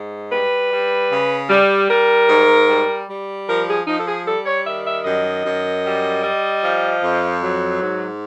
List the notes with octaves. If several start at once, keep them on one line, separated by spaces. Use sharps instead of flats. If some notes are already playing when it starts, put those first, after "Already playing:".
Already playing: G#2
G3 B4
G3
C#3
G3
G3 A#4
G#2
G3
G3
F3 A#4
G#4
F3 D#4
A4
G#4
G3 A4
C#5
D#3 E5
E5
F#2 D#5
F#2
G3
G3
F3
F2
F#3
G#2